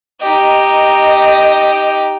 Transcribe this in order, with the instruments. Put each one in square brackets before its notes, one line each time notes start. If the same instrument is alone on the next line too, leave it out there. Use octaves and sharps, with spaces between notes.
[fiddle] D#4 G4 [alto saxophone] D#5